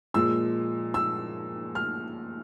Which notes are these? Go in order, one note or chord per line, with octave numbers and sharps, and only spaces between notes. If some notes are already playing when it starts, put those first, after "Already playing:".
A#2 F3 G#3 E6
E6
F6